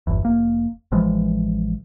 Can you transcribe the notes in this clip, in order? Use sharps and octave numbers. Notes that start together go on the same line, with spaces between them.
G1 E2
F1 A#3
A1 E3 F3 G#3